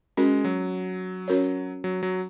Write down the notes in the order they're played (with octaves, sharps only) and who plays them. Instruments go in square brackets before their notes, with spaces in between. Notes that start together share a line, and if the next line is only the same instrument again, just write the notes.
[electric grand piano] G#3 [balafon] C#4 F#4 A#4
[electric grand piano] F#3
[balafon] C#4 F#4 A#4 C#5
[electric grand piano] F#3
F#3